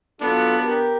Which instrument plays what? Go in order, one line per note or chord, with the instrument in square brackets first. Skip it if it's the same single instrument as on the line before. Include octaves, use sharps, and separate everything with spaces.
[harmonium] F#3 F4 A4 [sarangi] B3 [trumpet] D4
[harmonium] G4 A#4